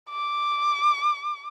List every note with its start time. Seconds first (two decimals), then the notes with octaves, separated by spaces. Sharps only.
0.10 D6